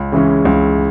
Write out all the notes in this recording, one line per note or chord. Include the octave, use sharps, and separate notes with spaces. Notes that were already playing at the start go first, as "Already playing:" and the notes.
Already playing: C#2
C#3 E3 G#3 C#4
C#2